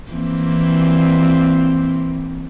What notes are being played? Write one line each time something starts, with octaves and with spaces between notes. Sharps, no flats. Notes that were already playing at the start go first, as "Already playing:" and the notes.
E3 A#3 C4